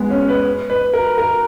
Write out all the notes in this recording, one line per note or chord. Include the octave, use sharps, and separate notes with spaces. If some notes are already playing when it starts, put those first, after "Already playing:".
Already playing: G#3 B3
C#4
B4
B4
A#4
A#4